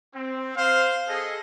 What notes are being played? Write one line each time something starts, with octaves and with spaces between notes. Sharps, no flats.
C4
C5 F5
G#4 A4 D#5